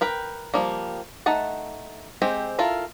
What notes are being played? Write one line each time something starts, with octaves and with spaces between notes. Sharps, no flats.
A#4 B4 G5
F3 G3 A#3
A3 D#4 F#5 A5
G#3 C4 G4
E4 F4 A4 A#4